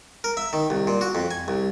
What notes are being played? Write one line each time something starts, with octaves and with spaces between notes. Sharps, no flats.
A#4
E5
D#3
C2
A#2
F#4
F2
G#5
C2